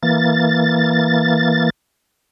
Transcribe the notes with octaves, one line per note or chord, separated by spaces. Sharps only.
E3 A#3 A6